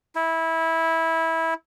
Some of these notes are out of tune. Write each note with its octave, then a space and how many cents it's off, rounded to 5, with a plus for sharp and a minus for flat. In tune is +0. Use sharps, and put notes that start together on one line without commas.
E4 -15